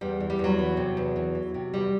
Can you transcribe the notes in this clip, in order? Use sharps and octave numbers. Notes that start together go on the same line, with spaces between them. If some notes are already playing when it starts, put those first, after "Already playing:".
E2 G3
E3
G3
E2 F#3
E3
C3
E2
E3
E3
C3
E2 G3